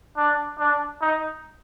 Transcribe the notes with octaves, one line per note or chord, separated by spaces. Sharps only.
D4
D4
D#4